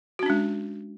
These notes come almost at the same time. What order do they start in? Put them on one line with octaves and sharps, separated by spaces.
F#4 C#4 D4 G#3